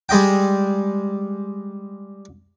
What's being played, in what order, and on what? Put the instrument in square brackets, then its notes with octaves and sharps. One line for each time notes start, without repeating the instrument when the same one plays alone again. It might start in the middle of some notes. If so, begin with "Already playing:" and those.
[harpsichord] G3 G#3 D#5 G5